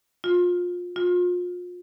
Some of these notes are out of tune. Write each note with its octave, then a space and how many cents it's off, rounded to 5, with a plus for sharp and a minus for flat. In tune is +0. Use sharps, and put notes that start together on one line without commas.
F4 +25
F4 +35